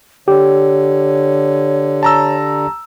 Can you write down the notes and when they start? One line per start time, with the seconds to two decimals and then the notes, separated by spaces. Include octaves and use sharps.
0.28 D3 G4 C#5
2.03 A5 A#5 E6